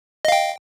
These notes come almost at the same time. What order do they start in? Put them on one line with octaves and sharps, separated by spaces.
D#5 F5 G5